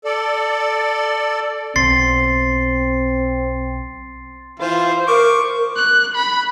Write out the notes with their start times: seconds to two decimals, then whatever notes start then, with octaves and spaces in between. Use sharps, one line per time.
0.04 A4 D5
1.76 B1 C4 C6 A6 C7
4.60 E3 F4 C5
5.08 A#4 C#6 D6
5.76 F#6
6.15 B5